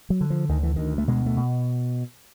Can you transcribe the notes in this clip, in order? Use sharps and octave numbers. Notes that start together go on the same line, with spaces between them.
F#3
D3
F3
D2 D#3
E3
D2 D#3
A3
B2 G#3
A3
B2